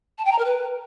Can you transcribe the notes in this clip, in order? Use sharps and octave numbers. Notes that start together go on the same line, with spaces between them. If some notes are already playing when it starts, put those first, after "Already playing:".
A5
G5
A#5
A#4
B4